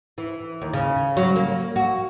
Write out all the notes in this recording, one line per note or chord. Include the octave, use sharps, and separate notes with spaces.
E3
D#2
C#3
F#3
A#3
F#4